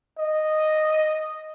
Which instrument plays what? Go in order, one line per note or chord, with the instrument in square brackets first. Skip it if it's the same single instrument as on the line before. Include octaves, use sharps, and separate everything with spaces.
[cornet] D#5